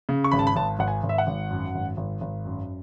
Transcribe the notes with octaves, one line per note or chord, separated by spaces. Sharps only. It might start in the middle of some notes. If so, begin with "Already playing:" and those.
C#3
C#6
G#1 B5
A5
B5
G#1 A5
G#1 F#5
G#5
G#1
E5
F#5
G#1
F#2
G#1
G#1
G#1
F#2